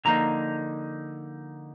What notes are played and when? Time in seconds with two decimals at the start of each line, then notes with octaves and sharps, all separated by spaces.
0.05 D3 F3 A#3 D#4 A#5